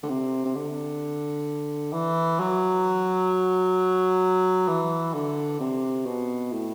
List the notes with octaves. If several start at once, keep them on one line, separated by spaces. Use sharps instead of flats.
D3
C3
C3
D3
E3
F#3
E3
D3
C3
B2
A2